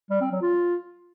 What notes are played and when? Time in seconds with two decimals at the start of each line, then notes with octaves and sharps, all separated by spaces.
0.10 G3
0.21 C4
0.32 F#3
0.42 F4